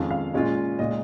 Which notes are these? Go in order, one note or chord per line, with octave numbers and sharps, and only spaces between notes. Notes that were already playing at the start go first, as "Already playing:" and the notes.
Already playing: F2 D#3 G#3 C#4 F4
F5
A#2 G#3 C#4 F4
A#2 G#3 D#4 D#5